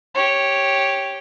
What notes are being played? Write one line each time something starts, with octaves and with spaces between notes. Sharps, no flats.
G4 C#5